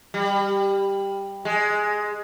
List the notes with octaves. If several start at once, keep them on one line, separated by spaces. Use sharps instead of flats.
G3
G#3